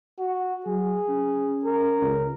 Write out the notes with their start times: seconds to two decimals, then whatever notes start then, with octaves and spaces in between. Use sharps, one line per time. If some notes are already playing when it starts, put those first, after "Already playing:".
0.19 F#4
0.66 F#3 G#4
1.09 C#4
1.64 A#4
2.02 C#2